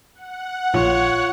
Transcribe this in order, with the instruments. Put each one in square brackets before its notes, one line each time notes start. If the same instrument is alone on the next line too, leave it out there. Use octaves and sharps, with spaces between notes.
[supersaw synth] F#5
[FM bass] A#1 [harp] F4 [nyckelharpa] C#5